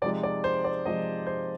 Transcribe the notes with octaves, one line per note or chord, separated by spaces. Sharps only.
C3 F3 G#3 D#4 D5
D5
C5
D5
C3 F3 G#3 D#4 D#5
C5